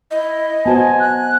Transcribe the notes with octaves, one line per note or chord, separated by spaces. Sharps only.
E4 D#5
B3 F#4 C5 G#5 A5
F#6